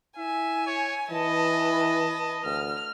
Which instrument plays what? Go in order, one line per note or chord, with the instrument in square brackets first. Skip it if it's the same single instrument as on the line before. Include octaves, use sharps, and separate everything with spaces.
[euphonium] E4 [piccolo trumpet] E5 [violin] G#5
[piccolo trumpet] C#5
[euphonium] E3 [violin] B4 A5 [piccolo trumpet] D#5
[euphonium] D2 [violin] F6